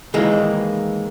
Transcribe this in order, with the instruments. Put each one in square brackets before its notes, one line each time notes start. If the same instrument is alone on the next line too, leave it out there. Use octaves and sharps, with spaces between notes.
[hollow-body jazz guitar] D#3 E3 G#3 A#3